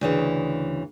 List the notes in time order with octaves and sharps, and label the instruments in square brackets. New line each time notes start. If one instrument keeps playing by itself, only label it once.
[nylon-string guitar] D2 C#3 E3